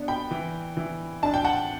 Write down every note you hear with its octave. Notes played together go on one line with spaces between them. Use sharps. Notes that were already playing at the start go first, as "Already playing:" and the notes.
Already playing: B3 D4
G5 B5
E3
E3
D4 A5
G5
F#5 A5